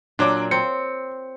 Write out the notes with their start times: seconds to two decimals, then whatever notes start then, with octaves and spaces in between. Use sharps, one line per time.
0.19 A#2 F#3 D4 D6
0.51 C4 C#7